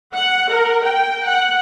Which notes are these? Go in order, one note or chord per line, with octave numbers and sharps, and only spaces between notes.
F#5
A#4
G5
F#5